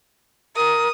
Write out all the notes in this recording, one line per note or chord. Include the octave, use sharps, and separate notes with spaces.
A#4 D#6